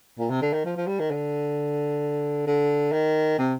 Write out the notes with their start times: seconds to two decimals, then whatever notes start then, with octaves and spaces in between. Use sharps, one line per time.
0.19 A#2
0.30 C3
0.42 D3
0.53 D#3
0.65 F3
0.77 F3
0.87 G3
0.99 D#3
1.11 D3
2.47 D3
2.92 D#3
3.38 C3